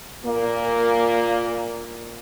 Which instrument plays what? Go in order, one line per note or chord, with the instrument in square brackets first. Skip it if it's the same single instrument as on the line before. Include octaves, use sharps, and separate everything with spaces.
[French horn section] A#2 A#3